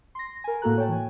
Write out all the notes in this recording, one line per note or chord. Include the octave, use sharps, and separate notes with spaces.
C6 A#6
A#4 G#5
A2 A#3 F#4 A4 A#5 F#6
C#5 G5 A5
E3 G#5